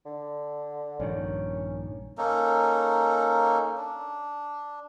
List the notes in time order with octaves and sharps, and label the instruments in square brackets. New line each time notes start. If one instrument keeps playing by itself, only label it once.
[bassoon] D3
[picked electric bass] A#1 G2 D#3 [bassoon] C#4
[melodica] A#3 C#4 D#4 A4
D4